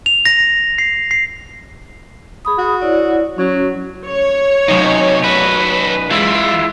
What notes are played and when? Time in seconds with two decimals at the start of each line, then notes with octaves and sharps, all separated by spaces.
0.06 F7
0.25 A#6
0.78 C7
1.11 C7
2.45 G#4 B5 D#6
2.58 F#4
2.81 E4 C#5 D5
3.38 F#3 C#4 F#4
4.06 C#5
4.69 F#2 C3 D#4
5.24 F#4 A4 B4
6.11 E3 G#3 E4 F4